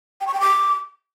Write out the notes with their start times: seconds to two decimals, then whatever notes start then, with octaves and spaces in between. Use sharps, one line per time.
0.21 G5
0.27 C#6
0.34 G5
0.40 D6